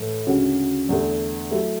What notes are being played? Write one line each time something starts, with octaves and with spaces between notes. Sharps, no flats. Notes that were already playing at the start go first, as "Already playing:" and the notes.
Already playing: A2 E3 A3
D2 C#3 G#3 C#4 F#4
E2 D3 A3
F#3 A3 E4